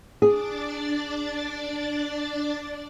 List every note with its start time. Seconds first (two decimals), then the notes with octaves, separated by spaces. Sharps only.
0.22 D4 G#4 D5 A6